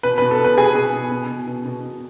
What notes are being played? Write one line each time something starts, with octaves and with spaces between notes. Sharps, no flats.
B2 B4
B4
B2
A4
B2
B4
B2 G#4 G#5
B2
B2
B2
B2
B2
B2
B2